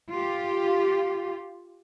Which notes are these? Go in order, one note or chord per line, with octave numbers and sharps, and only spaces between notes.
F4 G4